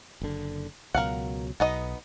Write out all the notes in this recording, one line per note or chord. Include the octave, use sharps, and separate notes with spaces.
F#1 D3
C#2 B2 F#3 A#4 F5 F#5
B1 B3 D#4 D#5